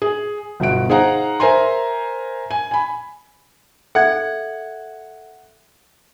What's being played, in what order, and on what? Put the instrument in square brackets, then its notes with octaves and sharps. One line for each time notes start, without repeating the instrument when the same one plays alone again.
[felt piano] G#4
G1 B2 F#5 D7
D#4 G#4 C5 F5 F#5 A#5
A#4 C5 E5 G#5 A#5 C6
G#5
G#5 B5
[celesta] A4 E5 G#6 [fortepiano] F#5